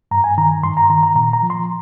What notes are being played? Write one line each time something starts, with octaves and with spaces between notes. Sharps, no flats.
G2 A#5
G#5
D#3 A#5
G2 C6
A#5
D#3 A#5
A#5
A#2 A#5
A#5
F3
C6